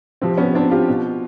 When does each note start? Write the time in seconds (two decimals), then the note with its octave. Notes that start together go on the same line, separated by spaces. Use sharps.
0.22 C3 F3 C4
0.38 B3 C#4
0.55 C4 D4
0.71 F4 G4
0.89 B2